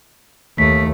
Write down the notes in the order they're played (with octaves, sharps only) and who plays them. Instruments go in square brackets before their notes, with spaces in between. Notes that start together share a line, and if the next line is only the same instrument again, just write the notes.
[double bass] D#2 [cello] A3 [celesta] B6